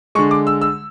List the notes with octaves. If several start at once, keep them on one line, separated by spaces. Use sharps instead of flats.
D3 G#3 C#6
D6
E6
E6